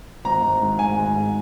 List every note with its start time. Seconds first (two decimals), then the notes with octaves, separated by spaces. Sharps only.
0.25 G#1 A#5
0.42 G#1
0.61 G#2
0.79 G#1 G#5
0.97 G#2
1.15 G#2